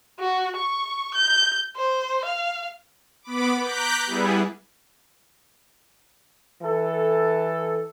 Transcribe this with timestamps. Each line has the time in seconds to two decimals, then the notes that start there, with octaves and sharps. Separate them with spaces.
0.19 F#4
0.57 C#6
1.15 G6
1.76 C5
2.25 F5
3.23 B3 B5 D6
3.60 A#5 D6 F#6 G6 B6
4.07 G3 B3 E4 G#4 B4
6.61 E3 A4